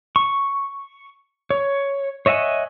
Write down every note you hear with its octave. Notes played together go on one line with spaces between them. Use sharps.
C#6
C#5
C#5 D#5 E5 F#5 G#5